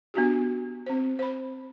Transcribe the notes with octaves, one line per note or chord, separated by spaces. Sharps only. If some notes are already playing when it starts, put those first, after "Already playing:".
B3 D4 F#4 G4
C4 C5
C5 B5